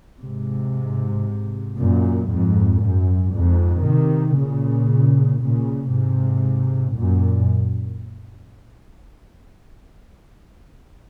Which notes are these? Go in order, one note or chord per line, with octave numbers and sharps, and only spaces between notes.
G#2 C3
F#2 A#2
F2 G#2
F#2
F2 G#2
C3 D#3
A#2 C#3
A#2 C#3
G#2 C3
F#2 A#2